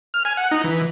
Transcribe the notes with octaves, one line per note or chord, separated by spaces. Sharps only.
F6
G#5
F#5
D#4
E3